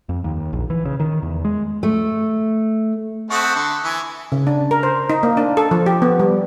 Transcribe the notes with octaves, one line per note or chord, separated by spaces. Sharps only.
F2
D#2
A#1
E3
C#3
D#3
E2
G#3
A3
A3 C4 F#5 C#6 D#6 F#6
D3
E3 G#5
C#3
D4
A#4
C5
D#4
A#3
D4
A4
F3
G4
B3
G3